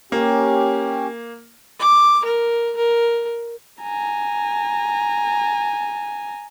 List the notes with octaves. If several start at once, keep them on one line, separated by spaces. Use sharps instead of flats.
A#3 C#4 G4
D6
A#4
A#4
G#5 A#5